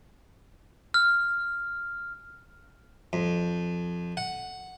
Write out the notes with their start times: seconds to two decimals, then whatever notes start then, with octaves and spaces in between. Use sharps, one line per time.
0.94 F6
3.13 F2
4.17 F#5